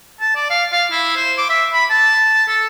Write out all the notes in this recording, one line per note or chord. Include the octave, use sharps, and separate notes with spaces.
A5
D5
F5
F5
E4
C5
D6
E5
B5
A5
A4